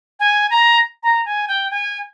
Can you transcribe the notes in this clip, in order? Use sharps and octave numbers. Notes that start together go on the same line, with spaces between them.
G#5
A#5
A#5
G#5
G5
G#5